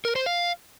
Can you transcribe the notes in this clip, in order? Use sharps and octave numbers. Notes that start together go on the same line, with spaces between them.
A#4
C5
F5